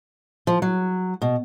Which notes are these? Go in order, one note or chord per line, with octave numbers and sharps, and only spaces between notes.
F3
F#3
B2